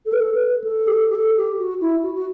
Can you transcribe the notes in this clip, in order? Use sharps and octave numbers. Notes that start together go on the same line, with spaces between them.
A4
B4
A4
B4
A4
G4
A4
G4
A4
G4
F#4
E4
F#4
F#4